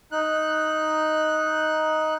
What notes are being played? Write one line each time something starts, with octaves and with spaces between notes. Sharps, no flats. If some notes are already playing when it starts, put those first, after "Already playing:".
D#4 F#6